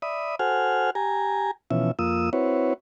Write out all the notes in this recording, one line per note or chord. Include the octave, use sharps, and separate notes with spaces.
D5 E5 B5 D#6
F#4 A4 C5 F#5 G#5 F6
G4 G#5 A#5
B2 E3 F3 C#4 E5
F2 A#3 F4 D#6 E6
C4 E4 F#4 B4 C#5